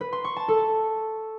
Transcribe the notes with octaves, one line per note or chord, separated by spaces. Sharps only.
B4
C6
C#6
A5
A4